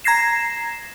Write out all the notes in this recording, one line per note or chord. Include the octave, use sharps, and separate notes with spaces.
A#5 G#6 A#6 C7 E7